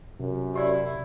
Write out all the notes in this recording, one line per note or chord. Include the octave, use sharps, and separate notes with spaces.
F#2 C3
E4 G4 D5